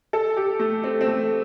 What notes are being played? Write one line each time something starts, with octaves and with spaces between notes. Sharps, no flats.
A4
G4
A3
C4
C4
A3